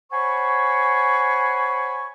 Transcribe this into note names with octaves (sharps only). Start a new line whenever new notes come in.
C5 C#5 F#5 G#5 B5 C#6